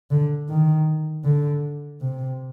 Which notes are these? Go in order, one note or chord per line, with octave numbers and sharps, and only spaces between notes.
D3
D#3
D3
C3